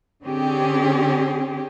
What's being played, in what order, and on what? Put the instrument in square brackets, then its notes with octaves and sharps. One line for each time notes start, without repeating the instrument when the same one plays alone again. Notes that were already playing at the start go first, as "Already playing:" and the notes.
[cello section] D3 C4 C#4 G4 G#4